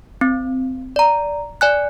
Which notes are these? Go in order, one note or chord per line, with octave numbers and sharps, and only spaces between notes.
C4
D5 A#5
D5 G#5 F#6